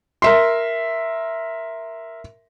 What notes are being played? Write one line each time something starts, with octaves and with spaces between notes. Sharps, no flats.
A#4 E5 C6